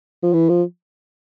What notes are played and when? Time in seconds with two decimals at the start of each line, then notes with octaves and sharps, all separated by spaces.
0.23 F3
0.34 E3
0.49 F3